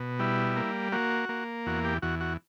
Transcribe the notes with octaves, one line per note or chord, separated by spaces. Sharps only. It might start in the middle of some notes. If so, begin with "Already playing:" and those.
Already playing: B2
G3 E4
A#3
A#3 F#4
A#3
E2 F#4
G4
E2 F#4
F#4